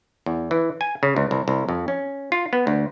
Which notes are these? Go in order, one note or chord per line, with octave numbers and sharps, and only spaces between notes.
E2
E3
G#5
C#3
C#2
C2
C2
F2
C#4
F4
B3
D2